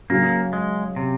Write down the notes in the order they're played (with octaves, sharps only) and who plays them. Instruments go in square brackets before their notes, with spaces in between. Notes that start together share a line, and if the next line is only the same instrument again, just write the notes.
[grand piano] C#3 F#3 C#4 [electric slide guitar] A#3
[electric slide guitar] G#3
C3